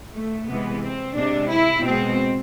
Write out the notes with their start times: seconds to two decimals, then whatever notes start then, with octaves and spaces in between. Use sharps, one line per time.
0.15 A3
0.49 C3 E3 G#3 B3
0.83 C4
1.16 C3 G#3 D4
1.51 E4
1.84 B2 G#3 C4